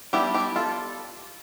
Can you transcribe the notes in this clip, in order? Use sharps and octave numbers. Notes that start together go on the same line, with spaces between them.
G3 B3 D4 E4 G4
E4 G4
F4 A4